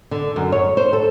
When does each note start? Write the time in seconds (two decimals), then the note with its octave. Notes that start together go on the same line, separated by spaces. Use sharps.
0.11 D3
0.36 F#2
0.52 C#5
0.77 C5
0.93 A4